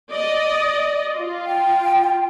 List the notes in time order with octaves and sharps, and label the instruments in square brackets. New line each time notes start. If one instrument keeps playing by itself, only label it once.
[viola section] D5 D#5
F4
[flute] G5